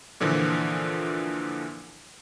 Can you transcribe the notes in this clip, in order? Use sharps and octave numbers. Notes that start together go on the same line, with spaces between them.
A#2 D3 E3 F3